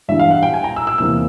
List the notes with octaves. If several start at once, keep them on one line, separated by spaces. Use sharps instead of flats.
G2 E3 G3 E5
F5
F#5
G5
G#5
A#5
E6
E6
E2 C3 F3 A#3 E6